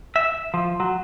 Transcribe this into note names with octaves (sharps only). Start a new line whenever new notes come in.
E5
F3
F#3